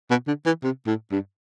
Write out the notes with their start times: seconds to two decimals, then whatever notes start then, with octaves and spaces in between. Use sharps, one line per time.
0.11 B2
0.27 D3
0.46 E3
0.63 C3
0.87 A2
1.11 G2